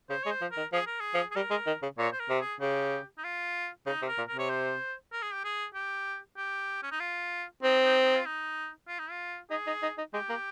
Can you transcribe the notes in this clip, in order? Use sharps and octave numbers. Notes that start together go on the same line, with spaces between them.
C#3 C5
G#3 C#5
C5
F3
A#4
D#3
F3 G#4
A#4
G#4
F3
G#4
G3 A#4
G#3
D#3
C#3
A#2 C#5
C5
A#4
C3
G#4
C#3 G4
D#4
F4
C#3 D#4
C3
A#4
A#2
A#4
C3
C#5
C5
A#4
G#4
G4
G#4
G4
G4
C#4
D#4
F4
C4 D#4
D#4
D#4
F4
D#4
F4
D#4
F4
D#4 G#4
D#4
D#4
D#4
G#3 G4
A#3